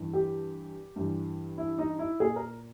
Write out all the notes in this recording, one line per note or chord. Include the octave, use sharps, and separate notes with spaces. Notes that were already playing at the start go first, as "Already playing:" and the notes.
Already playing: G2 E3
G4
G2 E3
E4
D#4
E4
A#2 G#4
A#4